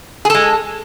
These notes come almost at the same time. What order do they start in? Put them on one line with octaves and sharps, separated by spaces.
G#4 A4 G#3